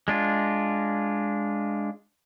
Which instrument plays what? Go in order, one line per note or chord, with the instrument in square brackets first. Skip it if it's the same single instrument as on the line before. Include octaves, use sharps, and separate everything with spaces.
[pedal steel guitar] G#3 D4 F4